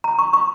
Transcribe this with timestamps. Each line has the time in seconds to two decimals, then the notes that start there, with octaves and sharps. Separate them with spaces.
0.04 A#5
0.19 C#6
0.33 C#6